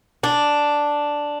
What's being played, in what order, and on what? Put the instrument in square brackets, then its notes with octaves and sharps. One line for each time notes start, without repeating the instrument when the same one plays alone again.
[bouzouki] D4